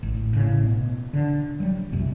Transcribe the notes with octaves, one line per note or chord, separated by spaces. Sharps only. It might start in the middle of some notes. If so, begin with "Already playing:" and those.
A1
A2 C#3
B2
D3
F#3 G3
A#1 F#2 C3